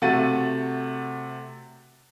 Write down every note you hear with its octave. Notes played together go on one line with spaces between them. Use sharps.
C3 A3 F#4 F#5 A6 D#7